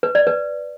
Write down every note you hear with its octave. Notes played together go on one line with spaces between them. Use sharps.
B4
D5
B4